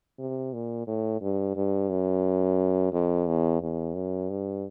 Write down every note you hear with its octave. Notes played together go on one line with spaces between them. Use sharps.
C3
A#2
A2
G2
G2
F#2
F2
E2
E2
F#2
G2